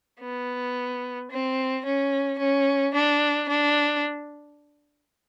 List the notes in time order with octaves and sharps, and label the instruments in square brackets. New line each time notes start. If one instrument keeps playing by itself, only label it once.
[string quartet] B3
C4
C#4
C#4
D4
D4